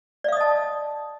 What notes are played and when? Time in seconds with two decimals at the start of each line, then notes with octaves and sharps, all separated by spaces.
0.24 D5
0.28 F5
0.32 D#6
0.37 D#5
0.41 A5